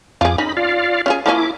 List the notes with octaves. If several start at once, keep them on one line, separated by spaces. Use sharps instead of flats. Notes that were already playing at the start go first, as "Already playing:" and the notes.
F2 F4 G#4 D6
C#4 D#4 B5
F4 D5 F5
C#4 F4 G#4
F3 A#3 C#4 E4 D6